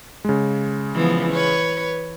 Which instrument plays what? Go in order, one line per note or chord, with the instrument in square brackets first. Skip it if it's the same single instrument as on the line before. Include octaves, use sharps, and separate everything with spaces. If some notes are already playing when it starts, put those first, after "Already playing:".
[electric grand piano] C#3 G#3
[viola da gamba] E3 F3 B3
B4 C#5